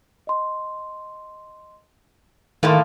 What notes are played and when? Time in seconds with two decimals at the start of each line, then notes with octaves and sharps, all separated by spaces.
0.27 D#5 C6
2.63 A2 D#3 A3 A#3 F5 C6